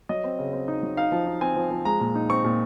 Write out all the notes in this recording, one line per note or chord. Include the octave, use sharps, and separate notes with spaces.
F#3 D#5
C4
C#3
C4
D#4
F#3
D#4 F5
F3
D#4
C4 G#5
F3
F3
G#3 A#5
A#2
D#4
C4 C#6
A#2